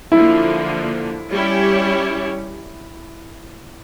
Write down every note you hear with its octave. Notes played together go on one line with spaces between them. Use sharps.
D3 F3 A#3 E4
G3 C#4 E4 G4 C#5